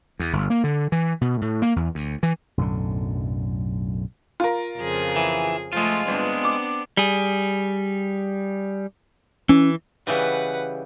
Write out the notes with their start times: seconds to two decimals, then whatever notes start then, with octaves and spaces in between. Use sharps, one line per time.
0.19 E2
0.33 G1
0.50 A#3
0.64 D3
0.92 E3
1.21 B2
1.41 A2
1.62 A#3
1.76 E2
1.95 D2
2.23 E3
2.57 B1 F#2 A2 D3
4.40 F4 A#4
4.78 F2 C#3 G#4
5.16 E3
5.73 F3 G#3 A3 F4
6.08 G1 B3 C4 D4
6.44 D6
6.97 G3 G#4
9.49 E3 C#4
10.07 C#3 E3 G3 B4 F#5